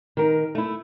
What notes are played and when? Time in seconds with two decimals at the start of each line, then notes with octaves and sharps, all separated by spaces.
0.17 D#3 A#4
0.55 A3 E4